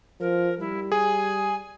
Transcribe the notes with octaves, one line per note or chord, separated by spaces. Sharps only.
F3 A#4
G3 E4
G#4 G#5